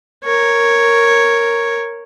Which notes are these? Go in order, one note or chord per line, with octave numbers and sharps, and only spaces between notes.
A#4 C#5